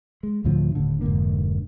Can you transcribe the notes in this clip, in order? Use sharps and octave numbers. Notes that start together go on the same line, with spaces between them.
G#3
D2 A2 D3 F3
D#1 A2 D3
F1 G#2 D3 A#3